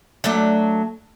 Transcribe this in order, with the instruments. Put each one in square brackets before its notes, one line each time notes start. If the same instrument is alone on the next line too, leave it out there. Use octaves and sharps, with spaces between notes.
[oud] F#3 A3 D4